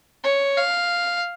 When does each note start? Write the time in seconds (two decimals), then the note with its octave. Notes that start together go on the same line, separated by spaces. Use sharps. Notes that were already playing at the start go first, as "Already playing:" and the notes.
0.24 C#5
0.57 F5